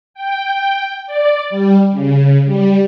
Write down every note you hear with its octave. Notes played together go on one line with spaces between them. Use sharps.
G5
D5
G3
C#3
G3